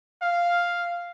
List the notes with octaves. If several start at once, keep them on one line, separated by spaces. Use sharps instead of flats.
F5